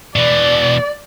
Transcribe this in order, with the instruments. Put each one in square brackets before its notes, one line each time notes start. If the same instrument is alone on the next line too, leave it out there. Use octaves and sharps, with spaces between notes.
[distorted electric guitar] B2 E3 [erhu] D5